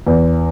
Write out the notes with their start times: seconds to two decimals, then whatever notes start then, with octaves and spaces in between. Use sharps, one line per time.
0.07 E2